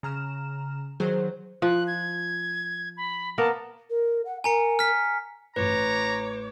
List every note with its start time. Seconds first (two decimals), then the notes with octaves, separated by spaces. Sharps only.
0.03 C#3 A#5 F6 E7
1.00 D#3 F#3 G#4 C5
1.62 F3 F#6
1.87 G#6
2.97 B5
3.38 A#3 B3 A#4 A5
3.90 A#4
4.25 F#5
4.44 A#4 G#5 A#5 C#7
4.79 F6 B6
5.56 A1 A2 B4 C#5 A#5 D6